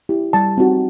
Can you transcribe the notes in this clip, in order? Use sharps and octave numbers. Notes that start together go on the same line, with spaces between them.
E4 G4
G3 A5
C4 D#4 F#4